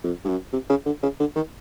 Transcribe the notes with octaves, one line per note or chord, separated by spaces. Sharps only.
F2
G2
F#2
C3
C#3
D3
C#3
D3
D#3